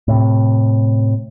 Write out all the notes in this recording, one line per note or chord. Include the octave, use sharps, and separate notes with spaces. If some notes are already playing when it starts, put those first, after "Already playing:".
A2 C3